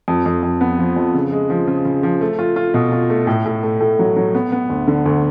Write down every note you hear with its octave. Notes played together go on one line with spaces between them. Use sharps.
F2
F2
F2
B3
F3
F2
C#3
G#3
F3
C#3
C#3
F3
A3
F4
F4
B2
F4
A3
A2
A2
A3
A2
F#3
F#3
B3
B3
D2
D3
D2